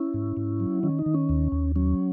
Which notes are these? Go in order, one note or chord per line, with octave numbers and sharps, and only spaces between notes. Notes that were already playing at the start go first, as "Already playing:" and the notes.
Already playing: C#4 E4
G#2
G#2
F#3
D#3 C#4
D#4
D#3
C#4
D#2
D#2
F#3 C#4